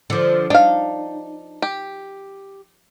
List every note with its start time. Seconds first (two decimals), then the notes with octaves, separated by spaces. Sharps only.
0.10 D3 F3
0.50 D4 D#4 F5
1.62 G4